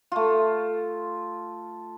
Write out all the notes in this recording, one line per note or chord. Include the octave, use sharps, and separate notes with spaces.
A3 F4